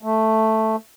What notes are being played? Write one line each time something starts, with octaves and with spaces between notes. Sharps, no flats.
A3